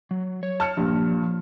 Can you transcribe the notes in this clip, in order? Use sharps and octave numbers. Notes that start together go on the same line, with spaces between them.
F#3
C#5
A5 F6 C#7
G2 A#2 F3